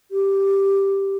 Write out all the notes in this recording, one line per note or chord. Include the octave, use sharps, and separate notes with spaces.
G4